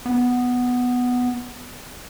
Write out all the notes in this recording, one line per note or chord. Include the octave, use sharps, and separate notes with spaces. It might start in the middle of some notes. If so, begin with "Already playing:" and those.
B3